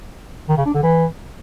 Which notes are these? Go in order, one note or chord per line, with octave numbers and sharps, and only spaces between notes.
D#3
C#3
D4
D3
E3